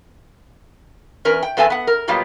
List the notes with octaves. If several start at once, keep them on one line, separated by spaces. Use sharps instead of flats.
E2 C#4 A#4 B4
G5
E2 B3 C4 A4 E5 G#5
B3 F#5
A#4
B2 F#3 G3 A#3 B3 F4